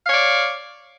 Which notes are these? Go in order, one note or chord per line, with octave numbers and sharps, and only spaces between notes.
C#5 D5 F5